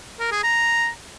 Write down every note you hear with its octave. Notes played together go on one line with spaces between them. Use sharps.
A#4
G#4
A#5